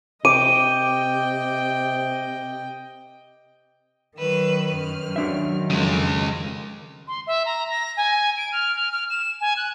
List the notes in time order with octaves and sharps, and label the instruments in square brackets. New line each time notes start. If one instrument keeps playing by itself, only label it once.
[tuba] C3 [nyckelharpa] D#5 G5 [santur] D6 [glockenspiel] D#7
[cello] D#3 [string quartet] F#3 B4 E6
[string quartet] F#2 F6
[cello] D#3 [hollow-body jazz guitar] F#3 D4 E5
[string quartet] F2 [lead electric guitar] C#3 G#3
[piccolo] C6
E5
A#5
A#6
G#5
D7
F6
F6
F6
E7
G#5
F#6